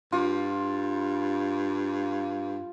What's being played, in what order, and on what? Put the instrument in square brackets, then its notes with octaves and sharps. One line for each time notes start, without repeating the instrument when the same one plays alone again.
[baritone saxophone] G2 [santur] F4